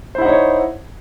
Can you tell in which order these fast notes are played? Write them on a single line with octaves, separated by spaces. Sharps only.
C5 E4 F#5 D#4 C#5